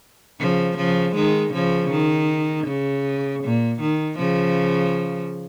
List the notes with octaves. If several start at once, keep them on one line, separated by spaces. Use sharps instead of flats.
C#3 F3
C#3 F3
D#3 G#3
C#3 F3
D#3
C#3
A#2
D#3
C#3 F3